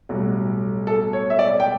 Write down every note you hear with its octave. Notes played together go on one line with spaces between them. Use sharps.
B1 A2 G3 F#4
A4
C#5
E5
D5
G5